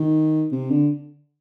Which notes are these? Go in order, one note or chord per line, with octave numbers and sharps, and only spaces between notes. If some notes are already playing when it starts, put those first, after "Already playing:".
Already playing: D#3
C3
D3